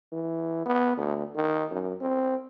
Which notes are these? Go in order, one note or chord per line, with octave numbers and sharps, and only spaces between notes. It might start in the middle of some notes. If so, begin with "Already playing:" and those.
E3
B3
D2
D#3
F#2
C4